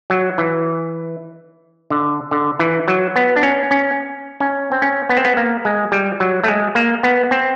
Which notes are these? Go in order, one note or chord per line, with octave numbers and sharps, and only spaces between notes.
F#3
E3
D3
D3
E3
F#3
B3
D4
C#4
C#4
C#4
C4
C#4
B3
C4
B3
A#3
G#3
G3
F#3
A3
G#3
A#3
B3
C4